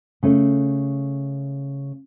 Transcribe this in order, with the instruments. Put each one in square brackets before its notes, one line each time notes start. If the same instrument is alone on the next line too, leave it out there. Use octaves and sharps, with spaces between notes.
[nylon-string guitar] C#3 A3 C#4